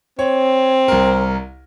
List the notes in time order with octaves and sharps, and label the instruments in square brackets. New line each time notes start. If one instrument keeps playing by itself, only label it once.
[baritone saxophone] C4 [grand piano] C#5
[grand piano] C2 A#4